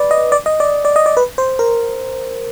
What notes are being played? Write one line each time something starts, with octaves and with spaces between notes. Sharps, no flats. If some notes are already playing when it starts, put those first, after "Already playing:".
Already playing: B4 D5
D#5
D5
D#5
D5
D5
D#5
D5
B4
C5
A#4